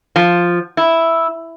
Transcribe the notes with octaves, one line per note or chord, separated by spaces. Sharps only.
F3
E4